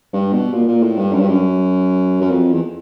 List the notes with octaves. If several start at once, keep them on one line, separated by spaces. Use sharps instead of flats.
G2
B2
A#2
A#2
A2
G2
F#2
G2
F#2
F#2
F2
E2